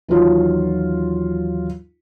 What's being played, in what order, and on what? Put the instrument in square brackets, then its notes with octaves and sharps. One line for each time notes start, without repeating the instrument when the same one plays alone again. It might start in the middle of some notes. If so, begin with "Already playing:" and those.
[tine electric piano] D#2 E3 F#3 [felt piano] D#4 F4